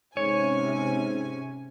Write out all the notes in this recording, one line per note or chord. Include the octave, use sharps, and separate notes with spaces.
G#2 C3 C#4 C#5 G#5